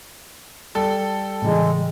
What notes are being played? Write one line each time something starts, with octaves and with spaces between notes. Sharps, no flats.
G3 A4
A2 C#3 E3 G#3